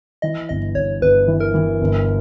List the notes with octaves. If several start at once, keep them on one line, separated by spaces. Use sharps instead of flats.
E3 D#5
G1 D#5
G1 C#5
G1 B4
E3
A#4
E3
G1